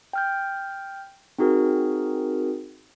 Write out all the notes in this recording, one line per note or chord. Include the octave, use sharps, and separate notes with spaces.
G5 F6 G6
C4 D#4 F#4 G#4 A#4